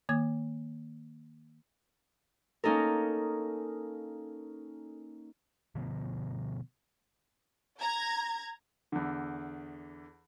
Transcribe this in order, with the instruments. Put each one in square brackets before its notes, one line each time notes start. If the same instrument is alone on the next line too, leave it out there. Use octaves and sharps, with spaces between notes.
[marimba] D#3 A#3 D6 G#6
[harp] A#3 C#4 D#4 A4 A#4
[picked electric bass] B2 D3 F3 B3
[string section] A#5 G#6
[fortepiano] E2 D3